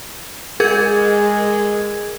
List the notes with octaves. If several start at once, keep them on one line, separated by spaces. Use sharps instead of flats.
G#3 G#4 A#4 G#6